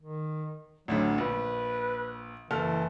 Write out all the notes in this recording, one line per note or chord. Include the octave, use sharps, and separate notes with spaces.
D#3
A1 D2 D3 F#3
A#1 B4
F#1 E3 A4 F6